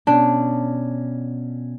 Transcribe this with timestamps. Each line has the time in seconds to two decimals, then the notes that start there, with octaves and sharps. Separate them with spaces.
0.07 B2 C#4 D4